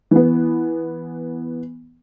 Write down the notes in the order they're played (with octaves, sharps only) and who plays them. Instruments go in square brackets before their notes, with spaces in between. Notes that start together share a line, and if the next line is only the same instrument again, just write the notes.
[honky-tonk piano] E3 B3